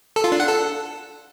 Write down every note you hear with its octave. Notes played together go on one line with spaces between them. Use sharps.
A4
F4
D4
F#5
A4